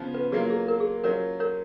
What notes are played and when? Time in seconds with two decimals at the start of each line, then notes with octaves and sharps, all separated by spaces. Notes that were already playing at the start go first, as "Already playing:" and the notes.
Already playing: C#3 F3 B3 F4
0.14 B4
0.32 F#3 A#3 F4 G#4
0.50 G#4
0.68 A#4
0.80 G#4
1.04 F#3 C#4 F4 A#4 C#5
1.40 A#4 C#5